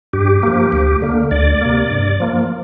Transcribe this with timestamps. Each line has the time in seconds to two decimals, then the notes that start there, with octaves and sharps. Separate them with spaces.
0.13 G2 G4
0.43 F3 A#3
0.72 D2
1.02 D3 A#3
1.31 D2 D5
1.61 C3 A#3
1.91 G2
2.20 F3 A#3